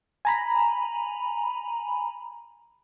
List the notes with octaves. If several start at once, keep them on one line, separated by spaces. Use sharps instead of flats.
G#5 A#5 B5